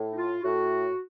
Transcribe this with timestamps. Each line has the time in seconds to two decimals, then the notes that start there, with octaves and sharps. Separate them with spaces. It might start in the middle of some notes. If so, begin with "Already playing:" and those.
Already playing: A2
0.11 D#4
0.16 F4
0.43 A2 F#4